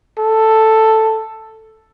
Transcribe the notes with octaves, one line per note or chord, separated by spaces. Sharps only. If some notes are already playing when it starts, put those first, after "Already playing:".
A4